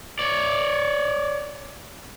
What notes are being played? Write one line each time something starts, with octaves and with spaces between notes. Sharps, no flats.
C#5 D5